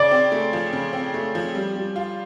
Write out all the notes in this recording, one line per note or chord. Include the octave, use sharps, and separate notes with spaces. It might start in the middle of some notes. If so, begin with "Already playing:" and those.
Already playing: C#3 D5
C4
A3
F3
C#3
C4
A3
F3
G3
G3
F4